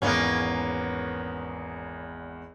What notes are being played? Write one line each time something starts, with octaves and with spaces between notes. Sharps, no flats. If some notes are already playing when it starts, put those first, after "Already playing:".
G#1 E2 A#3 B3 C#4